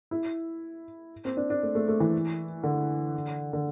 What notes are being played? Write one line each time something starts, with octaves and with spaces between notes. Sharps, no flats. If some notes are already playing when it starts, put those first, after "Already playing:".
E4
C4
D4
D4
A3
A3
A3
E3
D3
D3